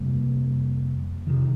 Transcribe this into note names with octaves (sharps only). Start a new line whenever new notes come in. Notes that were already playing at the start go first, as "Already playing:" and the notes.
Already playing: F2 C3 G3 A#3
F2 C3 D#3